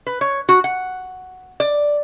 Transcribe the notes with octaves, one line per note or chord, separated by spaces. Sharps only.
B4
C#5
F#4
F#5
D5